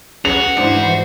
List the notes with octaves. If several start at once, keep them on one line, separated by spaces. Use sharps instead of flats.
C#4 F#4 G#4 B4 F7
G#2 E3 D4 C5 D5